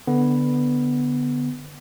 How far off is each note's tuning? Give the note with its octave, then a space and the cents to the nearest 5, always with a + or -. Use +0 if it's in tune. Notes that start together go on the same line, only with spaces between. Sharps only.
D3 +0 B3 +0